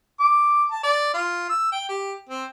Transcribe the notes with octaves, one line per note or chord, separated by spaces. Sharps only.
D6
A5
D5
F4
E6
G5
G4
C4